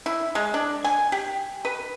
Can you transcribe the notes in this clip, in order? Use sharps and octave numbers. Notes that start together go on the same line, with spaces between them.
E4
G#3
D4
G#5
G4
B4